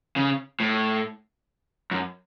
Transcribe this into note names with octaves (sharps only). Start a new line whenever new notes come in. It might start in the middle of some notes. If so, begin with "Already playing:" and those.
C#3
A2
F#2